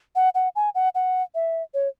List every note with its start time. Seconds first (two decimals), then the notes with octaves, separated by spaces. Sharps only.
0.15 F#5
0.35 F#5
0.56 G#5
0.75 F#5
0.95 F#5
1.35 E5
1.74 C#5